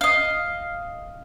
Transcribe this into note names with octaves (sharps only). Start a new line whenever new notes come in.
D#5 F5